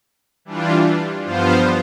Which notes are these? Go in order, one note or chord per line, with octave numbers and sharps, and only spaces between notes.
E3 G3 D4 F4
G2 F3 B3 F4 C5